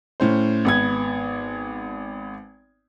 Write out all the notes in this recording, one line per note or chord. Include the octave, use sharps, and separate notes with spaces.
A2 C#4 C5
G#1 B3 G#6